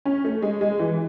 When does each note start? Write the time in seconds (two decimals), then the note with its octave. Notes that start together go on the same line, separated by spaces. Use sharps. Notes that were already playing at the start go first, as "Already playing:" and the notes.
0.06 C#4
0.24 A3
0.42 G#3
0.61 G#3
0.79 E3